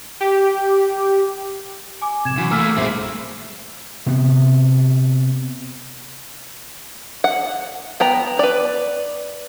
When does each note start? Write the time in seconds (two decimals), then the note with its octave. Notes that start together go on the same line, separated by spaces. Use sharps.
0.20 G4
2.02 G#5 D6
2.25 A#1 C3 G#6 E7
2.38 F#2 E3
2.51 A3 A#3 D6 E6 F6
2.77 A#1 G2 G#3 C4 E5
4.06 C3 B3
7.24 F#5
8.00 B3 G5 A#5
8.39 B4 D5